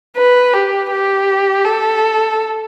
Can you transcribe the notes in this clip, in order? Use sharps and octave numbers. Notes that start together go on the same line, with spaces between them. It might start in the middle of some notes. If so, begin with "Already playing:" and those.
B4
G4
G4
A4